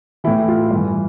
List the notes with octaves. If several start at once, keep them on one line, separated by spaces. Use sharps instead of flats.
A2 E3 E4
F4
G2 E3